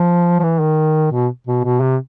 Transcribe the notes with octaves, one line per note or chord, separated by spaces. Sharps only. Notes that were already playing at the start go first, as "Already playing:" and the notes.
Already playing: F3
F3
E3
D#3
B2
B2
B2
C3